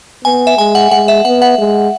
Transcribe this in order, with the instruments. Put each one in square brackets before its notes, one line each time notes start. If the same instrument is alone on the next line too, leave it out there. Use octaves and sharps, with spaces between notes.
[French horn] B3 [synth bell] G#5
[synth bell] E5
[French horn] G#3 [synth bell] G#5
[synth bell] F#5
[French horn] G#3 [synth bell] F#5
[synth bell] E5
[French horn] B3 [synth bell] F#5
[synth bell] F#5
[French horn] G#3